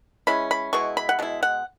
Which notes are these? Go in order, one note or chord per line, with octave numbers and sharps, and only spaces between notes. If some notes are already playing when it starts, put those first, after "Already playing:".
E3 G#3 C#4 E4 B5
B5
B2 G#3 B3 E4 C#6
B5
F#5
B2 G#3 E4
F#5